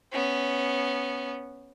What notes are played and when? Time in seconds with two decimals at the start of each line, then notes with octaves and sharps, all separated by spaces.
0.12 B3 C#4